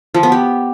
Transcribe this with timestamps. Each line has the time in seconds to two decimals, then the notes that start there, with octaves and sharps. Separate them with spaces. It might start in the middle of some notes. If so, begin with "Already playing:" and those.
0.14 F3
0.23 B3
0.32 G4